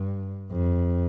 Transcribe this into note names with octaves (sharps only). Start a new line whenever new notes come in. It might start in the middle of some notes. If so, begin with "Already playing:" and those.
Already playing: G2
F2